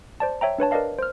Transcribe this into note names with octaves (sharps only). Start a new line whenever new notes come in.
C5 D5 A5
C#5 E5 G5 A#5
D4 B4 C#5 A5
A#4 B4 D5 D#5 F5 A5
C5 F6